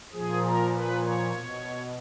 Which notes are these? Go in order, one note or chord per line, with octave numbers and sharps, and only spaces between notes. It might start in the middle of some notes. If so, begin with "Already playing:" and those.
A#2 F3 G#4
A#4
B4
C#5
B2